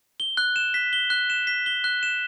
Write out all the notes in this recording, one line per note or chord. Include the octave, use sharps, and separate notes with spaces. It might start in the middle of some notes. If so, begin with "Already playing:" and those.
G7
F#6
E7
B6
G7
F#6
E7
B6
G7
F#6
E7